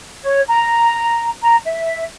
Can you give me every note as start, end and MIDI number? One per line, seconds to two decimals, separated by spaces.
0.22 0.41 73
0.48 1.29 82
1.42 1.56 82
1.64 2.02 76